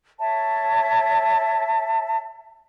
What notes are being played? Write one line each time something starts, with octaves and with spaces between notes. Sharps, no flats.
C#5 E5 A5